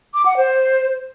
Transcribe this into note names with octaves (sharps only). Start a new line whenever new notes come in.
D6
F#5
C5